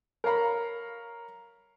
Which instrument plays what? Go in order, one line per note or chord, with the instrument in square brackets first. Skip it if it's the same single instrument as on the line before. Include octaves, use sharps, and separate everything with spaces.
[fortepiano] A#4 C#5 F5 A#5 B5